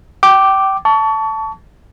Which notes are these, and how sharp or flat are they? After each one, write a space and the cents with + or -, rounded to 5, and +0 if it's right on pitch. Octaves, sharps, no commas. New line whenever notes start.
G5 -25 D6 +0
A5 +0 C#6 +35